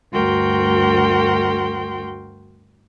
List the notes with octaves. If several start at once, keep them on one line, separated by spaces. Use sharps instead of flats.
D2 G2 F#4 A#4 G5 C6